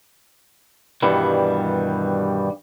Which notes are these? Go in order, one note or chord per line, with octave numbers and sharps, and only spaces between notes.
G2 B2 D#3 E3 G3